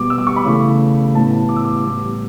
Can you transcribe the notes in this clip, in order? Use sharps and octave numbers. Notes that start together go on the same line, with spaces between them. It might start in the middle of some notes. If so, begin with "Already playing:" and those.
Already playing: B2 G3 B3 D6
E6
D6
C#6
B5
C#3 E3 A3
A2 E3 B3 A5
A5
D6
E6
D6
A2 G3 B3